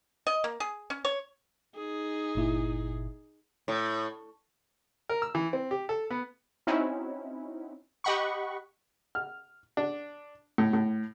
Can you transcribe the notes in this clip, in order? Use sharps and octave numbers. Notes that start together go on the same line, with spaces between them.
D#5
A#3
G#4
C#4
C#5
D#4 G#4
G1 A#2 E4
A2
A#4
E6
E3
C4
G4
A4
B3
C4 C#4 D#4 E4 F#4
G4 D#5 F#5 B5 C#6
F6
D4
A2
A2